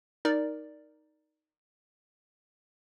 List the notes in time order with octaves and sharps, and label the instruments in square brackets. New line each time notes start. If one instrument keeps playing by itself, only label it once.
[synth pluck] D#4 A#4 D5